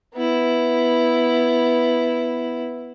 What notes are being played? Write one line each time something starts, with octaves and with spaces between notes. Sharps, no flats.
B3 E4